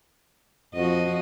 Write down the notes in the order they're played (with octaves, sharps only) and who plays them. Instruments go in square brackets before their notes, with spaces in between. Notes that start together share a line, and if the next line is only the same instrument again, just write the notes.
[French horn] F2 [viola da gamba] F3 F#4 D#5